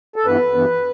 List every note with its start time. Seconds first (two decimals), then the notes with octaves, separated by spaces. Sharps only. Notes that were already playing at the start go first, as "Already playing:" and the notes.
0.16 A4
0.26 G2 E3 B3 B4
0.54 G2 E3 B3